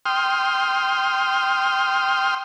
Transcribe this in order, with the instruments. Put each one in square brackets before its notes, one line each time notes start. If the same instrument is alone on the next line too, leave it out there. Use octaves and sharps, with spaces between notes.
[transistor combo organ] G5 C6 D#6 F6